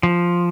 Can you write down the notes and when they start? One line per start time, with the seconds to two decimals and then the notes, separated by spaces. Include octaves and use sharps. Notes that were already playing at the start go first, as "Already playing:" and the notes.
0.03 F3